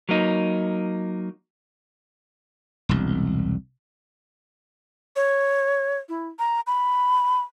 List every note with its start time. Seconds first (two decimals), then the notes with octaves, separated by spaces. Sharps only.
0.09 F#3 A#3 D#4
2.89 E1 C2
5.16 C#5
6.09 E4
6.39 A#5
6.67 B5